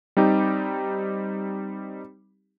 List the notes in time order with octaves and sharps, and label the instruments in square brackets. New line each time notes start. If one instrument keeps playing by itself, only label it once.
[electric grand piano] G3 C4 D#4 G4